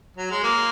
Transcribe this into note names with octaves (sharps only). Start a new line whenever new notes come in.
F#3
G#3
A#3